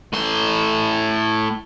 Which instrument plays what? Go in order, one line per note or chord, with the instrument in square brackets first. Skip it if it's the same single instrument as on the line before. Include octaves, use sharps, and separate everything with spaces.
[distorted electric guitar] A2 C6